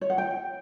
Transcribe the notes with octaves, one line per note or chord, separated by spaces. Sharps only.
C#5
F#5
G5